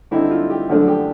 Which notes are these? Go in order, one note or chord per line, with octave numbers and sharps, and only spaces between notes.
G2 D3 G3 C4 D#4 E4
F4
G4
F#2 D3 F3 A3 D4
G4